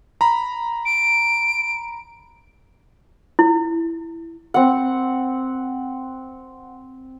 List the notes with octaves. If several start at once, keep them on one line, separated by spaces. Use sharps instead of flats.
A#5 B5
D7
E4
C4 F#5